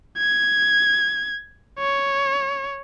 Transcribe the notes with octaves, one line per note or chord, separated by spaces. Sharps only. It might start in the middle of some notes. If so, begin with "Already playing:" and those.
G#6
C#5